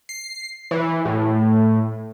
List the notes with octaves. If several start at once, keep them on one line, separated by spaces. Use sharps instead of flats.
C7
E3
A2